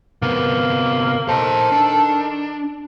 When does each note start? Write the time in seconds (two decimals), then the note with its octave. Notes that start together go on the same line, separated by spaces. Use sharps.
0.22 C3 A#3 B3
1.28 D#3 A4 C5 A#5
1.72 D4